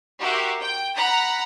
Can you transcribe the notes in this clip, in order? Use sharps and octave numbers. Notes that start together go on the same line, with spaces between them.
F#4 G4 A#4 E5 C6
G5
F#5 A#5 B5